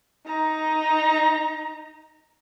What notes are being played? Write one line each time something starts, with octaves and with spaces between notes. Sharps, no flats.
D#4 A#5